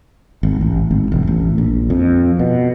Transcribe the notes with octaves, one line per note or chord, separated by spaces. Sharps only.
G#1
A1
G#1
E1
A1
A#1
F2
B2